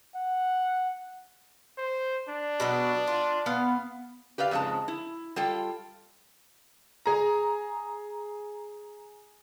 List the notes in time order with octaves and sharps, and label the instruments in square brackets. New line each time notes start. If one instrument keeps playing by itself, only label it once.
[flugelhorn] F#5
[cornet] C5
D4
[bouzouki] B2 F#3 B3
F4
B3 F5
[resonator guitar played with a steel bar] G4 B4 D5 F5
F2 G#2 C#3 G#3 A5
E4
G3 F4 A4 G5
[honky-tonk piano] G#4 A#5